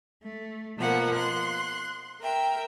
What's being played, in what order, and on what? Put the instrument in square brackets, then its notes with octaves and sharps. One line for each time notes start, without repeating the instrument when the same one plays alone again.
[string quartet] A3
B2 F3 A#3 F#5
C6 F#6
A#4 E5 G5